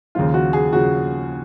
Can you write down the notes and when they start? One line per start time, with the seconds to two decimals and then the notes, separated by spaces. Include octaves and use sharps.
0.15 D#2 C#3 F3 F4
0.34 F#4
0.53 G#4
0.73 C#3 F3 F#4